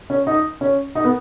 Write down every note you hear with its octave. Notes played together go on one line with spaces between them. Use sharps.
C#4
D#4
C#4
D#4
B3